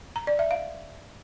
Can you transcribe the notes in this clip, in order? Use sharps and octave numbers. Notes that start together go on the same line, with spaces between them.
A#5
D5
E5
F5